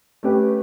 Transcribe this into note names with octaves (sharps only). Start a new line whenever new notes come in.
A3 C#4 G4 B4